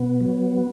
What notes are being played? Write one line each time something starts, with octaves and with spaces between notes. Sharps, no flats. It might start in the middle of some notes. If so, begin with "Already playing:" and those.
Already playing: B2 B3
F#3